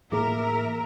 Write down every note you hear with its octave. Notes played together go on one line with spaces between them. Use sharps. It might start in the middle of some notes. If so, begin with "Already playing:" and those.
A2 E3 A#3 G#4 A#4 E5
E6